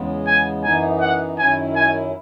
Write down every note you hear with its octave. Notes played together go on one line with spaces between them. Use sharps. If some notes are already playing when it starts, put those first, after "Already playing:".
Already playing: E2 C#3 G#3 B3
G#5
F#2 E3 B3 D#4 G#5
F#5
F#2 D#3 F#3 C#4 E4 G#5
G#5